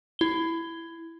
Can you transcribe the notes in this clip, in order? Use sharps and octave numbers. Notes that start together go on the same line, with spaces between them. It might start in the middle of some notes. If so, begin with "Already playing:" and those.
E4 G7